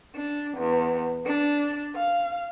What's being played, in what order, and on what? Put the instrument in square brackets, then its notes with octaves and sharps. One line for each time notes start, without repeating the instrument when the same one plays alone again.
[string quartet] D4
E2
D4
F5